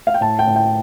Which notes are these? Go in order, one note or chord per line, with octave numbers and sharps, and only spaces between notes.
F5
G5
A2 A5
G5
A2
G5